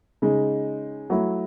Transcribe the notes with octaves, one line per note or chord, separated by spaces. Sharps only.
C#3 G#3 D#4
F#3 A3 E4